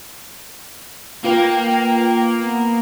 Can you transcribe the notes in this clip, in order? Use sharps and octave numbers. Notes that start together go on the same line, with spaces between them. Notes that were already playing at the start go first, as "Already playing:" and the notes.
A#3 F4 A#4 B4 G5
B3